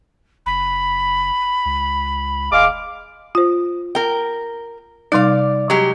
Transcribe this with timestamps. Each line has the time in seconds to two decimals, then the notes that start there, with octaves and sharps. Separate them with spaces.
0.46 F#1 B5
1.65 C#2
2.52 E1 G#3 F5 D6
3.35 F4 C5
3.95 A#4 G5
5.12 C3 G3 D#4 D5 F5
5.70 F#3 G#3 G4